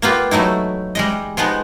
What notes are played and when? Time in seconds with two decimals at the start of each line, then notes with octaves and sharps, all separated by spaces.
0.02 A#3 B3 F4 G4
0.31 F#3 A3 D#4 E4
0.95 G3 G#3 D#5
1.37 F3 G#3 B3 D#4